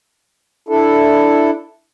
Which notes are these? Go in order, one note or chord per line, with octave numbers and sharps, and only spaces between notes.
D4 E4 A4